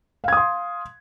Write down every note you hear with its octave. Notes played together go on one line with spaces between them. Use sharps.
F5 C6 D#6 G#6